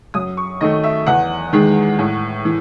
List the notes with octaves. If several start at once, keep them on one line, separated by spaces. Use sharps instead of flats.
F#2 D#6
C#6
D#3 A3 D#5
E5
E2 F#5
D#3 G#3
A2
E3